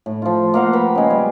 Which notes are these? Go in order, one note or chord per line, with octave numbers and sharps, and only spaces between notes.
A2
F3 F4
A#3 F5 F#5
B4 G5 B5
C#3 G#3
G3